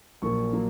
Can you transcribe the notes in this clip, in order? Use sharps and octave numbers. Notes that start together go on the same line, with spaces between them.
A#1 A#2 F#3 A#3 C#6
A#2 F#3 A#3